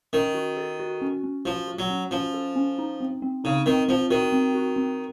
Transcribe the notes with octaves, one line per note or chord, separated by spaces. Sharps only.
D#3 C#4
F#4
A4
F#4
C#4
C#4
F3 F#4
F#4
F#3
C#4
F3 C#4
A4
C#4
D#4
C4
C4
C#3 D#4
D#3 C4
F3 C4
D#3 F#4
C4
F#4
C4